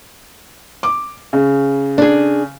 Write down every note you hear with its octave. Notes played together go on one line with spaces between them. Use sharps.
D6
C#3
D4 G#4